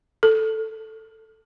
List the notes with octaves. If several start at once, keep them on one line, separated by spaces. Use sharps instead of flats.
A4